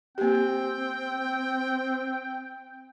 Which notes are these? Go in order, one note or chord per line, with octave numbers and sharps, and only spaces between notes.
A#3 C4 G4 G5